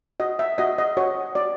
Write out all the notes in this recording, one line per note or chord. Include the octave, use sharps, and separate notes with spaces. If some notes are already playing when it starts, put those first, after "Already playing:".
F#4 D#5
E5
F#4 D#5
D#5
F#4 C#5
F#4 D5